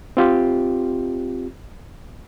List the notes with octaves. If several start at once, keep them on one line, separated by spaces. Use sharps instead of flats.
C4 F4 G4